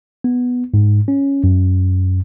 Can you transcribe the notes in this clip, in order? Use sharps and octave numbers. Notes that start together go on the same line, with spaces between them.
B3
G#2
C#4
F#2